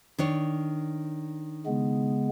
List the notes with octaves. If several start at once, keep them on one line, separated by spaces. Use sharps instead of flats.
D#3 D4 C#5
C#3 G#3 B3